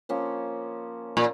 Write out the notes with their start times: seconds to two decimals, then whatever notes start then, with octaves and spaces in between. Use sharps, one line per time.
0.09 F3 A#3 C#4
1.17 A#2